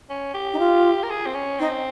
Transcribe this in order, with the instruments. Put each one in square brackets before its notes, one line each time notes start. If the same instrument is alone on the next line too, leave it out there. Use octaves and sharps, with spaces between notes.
[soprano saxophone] C#4
G4
[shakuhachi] D#4
F4
[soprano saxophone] A#4
G#4
C4
C#4
[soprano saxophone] C4 [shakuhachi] D#4